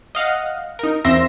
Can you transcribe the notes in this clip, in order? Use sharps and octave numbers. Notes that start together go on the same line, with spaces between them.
D#5 F5 F#5
D#4 A#4
E2 C4 E5 C6 E6 A#6